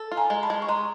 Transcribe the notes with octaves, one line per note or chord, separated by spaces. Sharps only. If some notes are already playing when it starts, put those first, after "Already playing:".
Already playing: A4
F4
G#5 A#5
G#3
A5 B5
G#3
C#6
G#3 A#5 C6